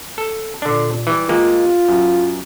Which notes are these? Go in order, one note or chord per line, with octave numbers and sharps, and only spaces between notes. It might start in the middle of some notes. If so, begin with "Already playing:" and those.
A4
A#2 D3 D4
E3 G3
G#3 A#3 F4 G4
F#2